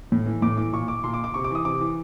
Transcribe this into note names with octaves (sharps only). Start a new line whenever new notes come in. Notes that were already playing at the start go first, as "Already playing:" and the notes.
A2
E3
A2 D6
E3 D6
A#2 C#6
D6
A#2 C6
D6
D6
C3 C#6
D6
E3 D#6
C3 D6
E3